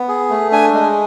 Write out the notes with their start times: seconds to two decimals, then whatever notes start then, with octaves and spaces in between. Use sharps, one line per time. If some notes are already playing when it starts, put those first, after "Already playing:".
Already playing: B3
0.08 G#4
0.30 A3
0.52 D4 G#5
0.73 G#3